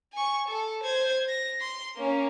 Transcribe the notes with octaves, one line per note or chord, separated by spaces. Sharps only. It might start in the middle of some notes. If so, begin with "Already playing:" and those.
G#5 C#6
A4
C5 G#6
A#6
C6
A#3 C#4